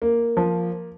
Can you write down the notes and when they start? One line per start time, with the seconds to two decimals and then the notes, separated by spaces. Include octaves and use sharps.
0.02 A#3
0.37 F3